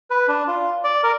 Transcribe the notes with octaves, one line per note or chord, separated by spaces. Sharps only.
B4
D4
F4
D5
A#4